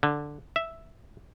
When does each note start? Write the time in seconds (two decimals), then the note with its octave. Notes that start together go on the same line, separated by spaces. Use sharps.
0.03 D3
0.56 E5